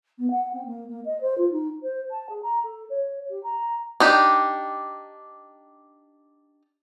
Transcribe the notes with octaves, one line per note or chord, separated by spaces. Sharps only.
B3
F#5
C4
A#3
A#3
D#5
C5
F4
D#4
C5
A5
G#4
A#5
A4
C#5
G4
A#5
D4 D#4 G4